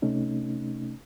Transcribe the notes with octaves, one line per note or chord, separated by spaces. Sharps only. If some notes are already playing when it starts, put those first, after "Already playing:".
C3 A3 C#4 D#4